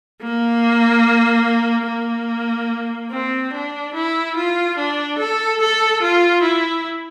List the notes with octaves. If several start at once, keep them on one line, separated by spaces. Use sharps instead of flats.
A#3
A#3
C4
D4
E4
F4
D4
A4
A4
F4
E4